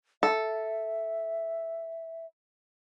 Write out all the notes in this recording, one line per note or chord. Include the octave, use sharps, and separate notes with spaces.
A4 E5